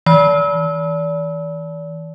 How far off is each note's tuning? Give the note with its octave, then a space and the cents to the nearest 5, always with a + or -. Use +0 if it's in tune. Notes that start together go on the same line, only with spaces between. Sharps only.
E3 -30 D5 -30